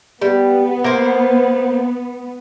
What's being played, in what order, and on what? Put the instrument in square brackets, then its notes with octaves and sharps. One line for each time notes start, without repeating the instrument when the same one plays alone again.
[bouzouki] G3 [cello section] B3
[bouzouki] A#3 C5